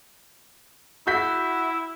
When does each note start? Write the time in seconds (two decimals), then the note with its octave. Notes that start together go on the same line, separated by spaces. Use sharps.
1.07 E4 F#4 G6 B6